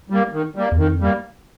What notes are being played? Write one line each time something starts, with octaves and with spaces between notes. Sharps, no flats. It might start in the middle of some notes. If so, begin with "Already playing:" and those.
G3 A#3
D#3
G3 A#3
E2
F2 D#3
G3 A#3